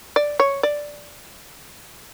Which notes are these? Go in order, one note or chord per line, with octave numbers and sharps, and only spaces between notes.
D5
C#5
D5